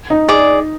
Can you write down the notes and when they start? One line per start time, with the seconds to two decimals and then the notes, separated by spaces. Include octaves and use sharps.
0.10 D#4
0.29 G#4 D5